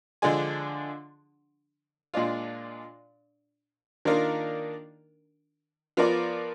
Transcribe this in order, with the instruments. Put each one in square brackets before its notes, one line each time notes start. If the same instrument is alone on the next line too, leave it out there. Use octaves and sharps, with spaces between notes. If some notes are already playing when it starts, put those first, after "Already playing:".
[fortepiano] D3 F3 G#3 D4 G#4
A#2 G#3 D4 F4
D#3 A#3 D4 F4 A#4
F3 B3 F4 A#4 D5